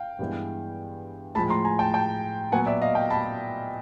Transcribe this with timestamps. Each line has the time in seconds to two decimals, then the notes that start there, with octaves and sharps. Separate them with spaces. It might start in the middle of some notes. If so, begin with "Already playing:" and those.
Already playing: F5 G5
0.19 G2 E3 G#3 B3
1.35 G#3 A5 B5
1.38 A2 F3
1.50 A#5 C6
1.65 G#5 A#5
1.79 G5 A5
1.94 G5 A5
2.52 A#2 F#3 B3 F#5 G#5
2.66 D5 E5
2.82 D#5 F5
2.95 F5 G5
3.10 A5 B5